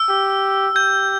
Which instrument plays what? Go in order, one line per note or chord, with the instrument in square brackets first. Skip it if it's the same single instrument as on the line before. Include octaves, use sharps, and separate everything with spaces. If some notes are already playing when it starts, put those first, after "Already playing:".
Already playing: [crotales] E6
[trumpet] G4
[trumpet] G4 [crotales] G6